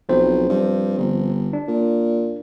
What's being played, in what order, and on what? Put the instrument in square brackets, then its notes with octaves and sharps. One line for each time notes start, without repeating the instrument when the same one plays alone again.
[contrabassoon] B1 [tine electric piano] F3 C4 C5
[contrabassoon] G2
G1
[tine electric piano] D4
[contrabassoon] A#2